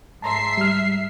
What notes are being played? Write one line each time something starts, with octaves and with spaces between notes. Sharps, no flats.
G#2 E5 A5 A#5 C6 C7
G3 F6